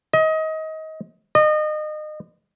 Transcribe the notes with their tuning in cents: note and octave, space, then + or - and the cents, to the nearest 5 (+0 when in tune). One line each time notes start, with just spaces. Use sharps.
D#5 +25
D#5 -30